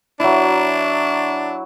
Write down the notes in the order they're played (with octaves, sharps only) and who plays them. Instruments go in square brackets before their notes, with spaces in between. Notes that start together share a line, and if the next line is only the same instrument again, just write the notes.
[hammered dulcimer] F#3 E4 [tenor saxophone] D4